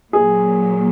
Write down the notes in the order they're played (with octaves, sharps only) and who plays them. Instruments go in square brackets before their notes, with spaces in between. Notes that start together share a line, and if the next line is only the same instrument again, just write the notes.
[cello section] A#2 F#3 A#3 [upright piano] G#4